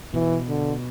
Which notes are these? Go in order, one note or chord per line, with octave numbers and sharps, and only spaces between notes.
B2 E3
D3